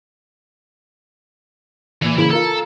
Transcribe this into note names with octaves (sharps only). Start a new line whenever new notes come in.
A#2 E3 G#6
C#3 E3 A#3 E4 B5
F4 A4 A#4 A#5